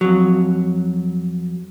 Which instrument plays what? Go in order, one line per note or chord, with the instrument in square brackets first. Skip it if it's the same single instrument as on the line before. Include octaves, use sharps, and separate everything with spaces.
[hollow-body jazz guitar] F2 F#3